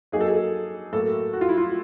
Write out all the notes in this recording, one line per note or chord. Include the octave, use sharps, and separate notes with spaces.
F#3 A#3 D#4 G#4
A4
G#4
A2 F#3 A#3 A4
F#4
F4
E4
F4